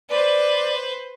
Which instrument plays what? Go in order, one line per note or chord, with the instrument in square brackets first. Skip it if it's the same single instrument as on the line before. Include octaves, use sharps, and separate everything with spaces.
[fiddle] B4 C5 [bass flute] D5